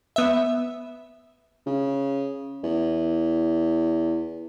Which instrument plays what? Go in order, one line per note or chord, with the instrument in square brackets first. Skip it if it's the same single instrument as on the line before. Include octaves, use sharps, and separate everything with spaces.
[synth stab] B3 E5
[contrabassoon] C#3
E2